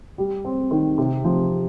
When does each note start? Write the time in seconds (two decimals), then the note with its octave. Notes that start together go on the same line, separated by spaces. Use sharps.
0.18 G3
0.45 C4
0.71 D#3
0.98 C3
1.24 F3